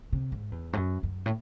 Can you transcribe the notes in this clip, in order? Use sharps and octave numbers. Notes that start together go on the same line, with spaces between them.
C3
G#2
E2
G#2
F#2
F#2
A2